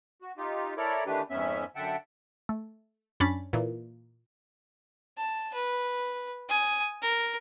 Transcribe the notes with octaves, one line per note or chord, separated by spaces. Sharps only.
F#4
D#4 F4 G4
E4 A4 A#4 C#5 D5
D#3 E3 A3 D4 G4 B4
F2 G#2 B3 C#4 E5
F#2 D3 E5 F#5 G5 A5
A3
F#2 C#4 D4 B5 A6 B6
A#2 E3
A5
B4
G#5 D#6
A#4